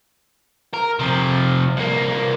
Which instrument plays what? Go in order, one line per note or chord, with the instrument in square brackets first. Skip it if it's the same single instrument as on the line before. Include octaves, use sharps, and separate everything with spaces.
[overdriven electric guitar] A#4
C3 F3
C2 A#3